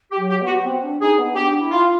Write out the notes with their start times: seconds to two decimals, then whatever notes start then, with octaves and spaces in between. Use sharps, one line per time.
0.11 G4
0.18 F#3
0.29 G4
0.41 B3
0.46 F#4
0.65 C4
0.83 D4
1.01 D#4 G#4
1.18 B3
1.36 D4 G4
1.61 E4
1.72 F4
1.83 F4